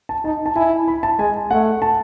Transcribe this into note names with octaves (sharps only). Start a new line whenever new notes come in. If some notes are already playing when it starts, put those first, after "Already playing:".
A5
D#4 A5
A5
E4 G#5
B5
A5
G#3 G#5
A3 F#5
A5